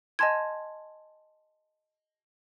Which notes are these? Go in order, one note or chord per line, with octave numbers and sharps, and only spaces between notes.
D#5 G#5 A5 C6 G#6